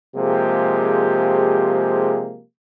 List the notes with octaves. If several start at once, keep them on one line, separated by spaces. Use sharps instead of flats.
C3 F3 G#3 A#3 G4 G#4